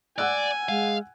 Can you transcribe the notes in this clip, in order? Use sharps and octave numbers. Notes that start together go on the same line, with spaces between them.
D5 F#5 G#5 E6 F#6
G#3 F5